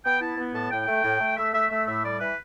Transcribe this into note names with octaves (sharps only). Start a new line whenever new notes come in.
B3 G5
E4 A5
B3
A2 A5
A2 G5
A3
A2
A3
A3 E5
A3 E5
A3 E5
A2 E5
G3 D5
E3 B4